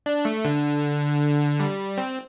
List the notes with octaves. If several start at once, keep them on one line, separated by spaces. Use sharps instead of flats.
D4
A3
D3
G3
C4